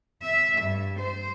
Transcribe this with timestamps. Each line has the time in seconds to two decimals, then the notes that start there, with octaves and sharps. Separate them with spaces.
0.23 E5
0.62 G2
0.99 C5